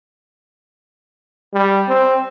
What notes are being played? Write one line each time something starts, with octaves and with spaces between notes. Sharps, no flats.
G3
C4